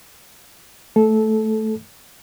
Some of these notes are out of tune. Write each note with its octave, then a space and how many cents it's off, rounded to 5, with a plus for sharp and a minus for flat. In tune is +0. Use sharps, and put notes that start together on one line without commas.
A3 +0 A4 -15